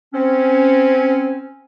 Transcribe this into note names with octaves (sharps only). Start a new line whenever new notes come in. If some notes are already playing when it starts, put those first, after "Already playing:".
C4 C#4